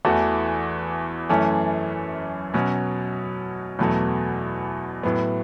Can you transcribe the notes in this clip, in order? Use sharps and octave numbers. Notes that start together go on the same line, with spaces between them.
E2 E3 A3 F#4
F#2 E3 A3 C#4
B2 F#3 C#4
E2 B2 F#3 A3
A2 F#3 B3